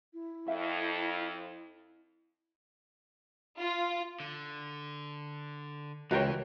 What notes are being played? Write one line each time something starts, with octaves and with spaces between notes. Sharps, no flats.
E4
F2 E5 F5
F4
D3
C#2 E3 F#4 A#4 C#5 G5